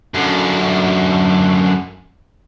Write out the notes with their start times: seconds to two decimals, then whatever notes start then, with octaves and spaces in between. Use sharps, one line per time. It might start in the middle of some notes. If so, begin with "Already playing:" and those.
0.14 F#2 D3